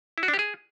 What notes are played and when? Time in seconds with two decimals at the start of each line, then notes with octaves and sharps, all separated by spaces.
0.18 E4
0.23 F#4
0.28 D4
0.34 G4
0.39 G#4